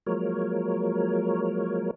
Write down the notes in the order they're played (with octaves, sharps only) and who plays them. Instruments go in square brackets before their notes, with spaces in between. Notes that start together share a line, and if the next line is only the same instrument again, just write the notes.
[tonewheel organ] F3 F#3 G#3 A#3 A#4 C#5